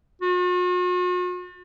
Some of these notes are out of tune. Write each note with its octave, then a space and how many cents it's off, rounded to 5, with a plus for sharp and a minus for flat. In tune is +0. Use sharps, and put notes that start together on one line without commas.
F#4 -45